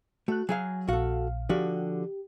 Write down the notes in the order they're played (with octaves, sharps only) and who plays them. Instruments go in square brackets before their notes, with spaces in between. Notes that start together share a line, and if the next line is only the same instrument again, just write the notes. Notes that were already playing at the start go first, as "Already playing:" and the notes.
[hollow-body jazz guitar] A3 [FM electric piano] F#4 F#6
[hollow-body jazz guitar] F#3 G#4 F5 [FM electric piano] G#5
[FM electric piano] A#1 A#2 F5 [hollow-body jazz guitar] F#4 A4
[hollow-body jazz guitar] D3 F3 F#4 [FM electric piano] G4